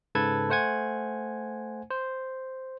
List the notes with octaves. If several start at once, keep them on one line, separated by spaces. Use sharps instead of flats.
G#2 C#3 A4 B4 A5 G#6
A3 C5 F#5 G#5 G#6
C5